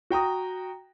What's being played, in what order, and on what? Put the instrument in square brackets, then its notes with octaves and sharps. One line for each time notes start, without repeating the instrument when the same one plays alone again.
[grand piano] F#4 G5 A#5 D#6